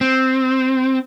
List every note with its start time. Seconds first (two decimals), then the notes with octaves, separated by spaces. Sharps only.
0.01 C4